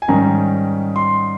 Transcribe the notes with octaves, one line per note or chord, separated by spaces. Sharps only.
G#5
G#2 D#3 G3 C#4 A#5
C6